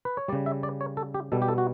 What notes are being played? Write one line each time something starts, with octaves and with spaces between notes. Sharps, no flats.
B4
C#5
C#3 G3 D5
E5
D5
C#5
A4
G4
B2 G3 A4
G4
A4
F#4